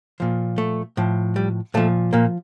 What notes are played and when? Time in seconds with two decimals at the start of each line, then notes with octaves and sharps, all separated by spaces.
0.20 A#2 F3
0.58 A3
0.97 A2 F3
1.36 G3
1.74 A#2 F3 A3
2.13 A#2 A#3